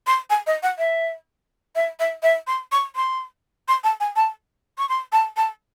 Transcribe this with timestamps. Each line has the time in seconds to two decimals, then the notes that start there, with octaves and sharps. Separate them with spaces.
0.07 C6
0.30 G#5
0.47 D#5
0.63 F#5
0.78 E5
1.75 E5
2.00 E5
2.23 E5
2.47 C6
2.72 C#6
2.96 C6
3.68 C6
3.84 A5
4.00 G#5
4.16 A5
4.78 C#6
4.89 C6
5.12 A5
5.37 A5